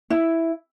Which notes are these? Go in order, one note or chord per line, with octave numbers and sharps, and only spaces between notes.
E4